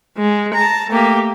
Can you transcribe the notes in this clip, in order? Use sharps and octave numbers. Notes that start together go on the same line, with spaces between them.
G#3
A5 A#5
A3 A#3 G4